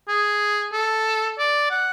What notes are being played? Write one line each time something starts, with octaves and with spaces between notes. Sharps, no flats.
G#4
A4
D5
F#5